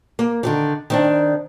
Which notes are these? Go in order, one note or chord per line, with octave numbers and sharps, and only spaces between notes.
A#3
D3 D#3 F3
D#3 C4 D4